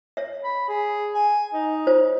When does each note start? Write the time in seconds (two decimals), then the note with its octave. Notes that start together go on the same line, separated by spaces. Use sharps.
0.17 C#5 E5
0.44 B5
0.68 G#4
1.14 G#5
1.53 D#4
1.87 F4 C5 C#5